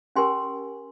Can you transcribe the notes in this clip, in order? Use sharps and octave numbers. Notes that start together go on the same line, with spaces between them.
C#4 G4 A#4 G#5 C6